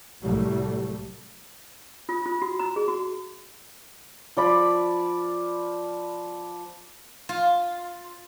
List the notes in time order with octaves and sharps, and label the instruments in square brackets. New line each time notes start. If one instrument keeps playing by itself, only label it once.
[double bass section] C2 A2 F#3 G3 A3
[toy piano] F4
F4
F#4
A#5
G#4
F#4
[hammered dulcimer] F3 D5 B5
[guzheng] F4